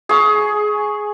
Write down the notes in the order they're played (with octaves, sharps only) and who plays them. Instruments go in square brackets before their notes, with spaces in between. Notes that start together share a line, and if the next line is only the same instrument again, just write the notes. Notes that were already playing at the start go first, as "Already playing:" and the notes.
[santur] G#4 C#6